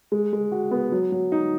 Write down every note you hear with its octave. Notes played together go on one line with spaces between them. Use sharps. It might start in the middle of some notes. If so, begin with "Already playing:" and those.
G#3
G#3
F#4
B3
F#3
F#3
D#4